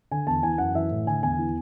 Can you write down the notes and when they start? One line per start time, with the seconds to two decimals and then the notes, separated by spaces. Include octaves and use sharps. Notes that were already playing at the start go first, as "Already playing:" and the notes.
0.11 D3 G#5
0.27 E2 A5
0.43 E3 G#5
0.58 F#2 F#5
0.75 E3 E5
0.90 A2
1.06 D3 G#5
1.23 E2 G#5
1.39 E3